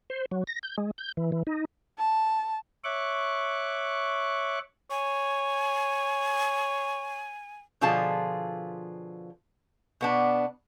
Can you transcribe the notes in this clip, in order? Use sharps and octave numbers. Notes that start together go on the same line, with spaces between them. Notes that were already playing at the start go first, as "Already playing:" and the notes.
C5
F#3
A#6
G6
G#3
G6
E3
E3
D#4
A5
C#5 E5 C#6 D6 F#6
C#5 G#5
B2 D3 F3 F4 G#4 A5
B2 B3 D4